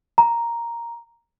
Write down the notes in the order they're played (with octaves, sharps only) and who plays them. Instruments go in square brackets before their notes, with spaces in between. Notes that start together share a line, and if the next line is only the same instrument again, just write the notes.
[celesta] A#5